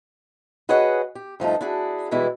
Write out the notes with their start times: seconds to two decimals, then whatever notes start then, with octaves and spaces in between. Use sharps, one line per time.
0.69 F#4 G#4 B4 C#5 D#5 F#5
1.15 G4
1.40 G2 F3 A3 D#4
1.61 D4 E4 F#4 G#4
2.11 B2 E3 G3 G#3 E4